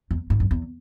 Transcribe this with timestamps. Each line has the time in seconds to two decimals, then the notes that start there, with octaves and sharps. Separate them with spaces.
0.11 E2
0.30 G#2
0.40 F#2
0.51 E2